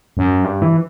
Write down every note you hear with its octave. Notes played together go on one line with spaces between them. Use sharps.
F#2
G2
E3